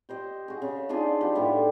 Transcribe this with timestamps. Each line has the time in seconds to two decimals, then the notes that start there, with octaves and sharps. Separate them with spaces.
0.09 G4 C5 D#5
0.48 F#4 G#4
0.62 C#3
0.89 D4 D#4 F4 G#4
1.21 F3 G4 B4
1.35 A2 B3 G4